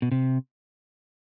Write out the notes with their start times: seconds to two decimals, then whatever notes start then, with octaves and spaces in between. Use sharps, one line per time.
0.02 B2
0.12 C3